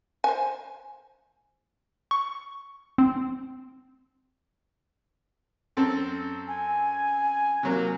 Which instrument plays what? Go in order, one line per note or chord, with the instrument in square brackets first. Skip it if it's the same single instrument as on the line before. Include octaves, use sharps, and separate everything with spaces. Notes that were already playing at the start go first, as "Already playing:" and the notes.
[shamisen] C5 G#5
[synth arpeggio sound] C#6
C4
[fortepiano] F#2 C4 A4
[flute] G#5
[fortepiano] C3 F#3 A#3